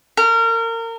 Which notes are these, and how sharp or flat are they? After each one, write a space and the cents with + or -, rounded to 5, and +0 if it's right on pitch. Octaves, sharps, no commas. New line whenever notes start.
A#4 -30